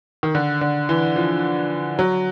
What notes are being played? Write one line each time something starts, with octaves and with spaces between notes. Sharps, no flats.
D#3
D3
D3
E3
F3
F#3